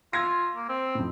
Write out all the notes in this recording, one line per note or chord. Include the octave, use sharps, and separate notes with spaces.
F4 E6 G#6 A#6
A#3
C4
F2 A2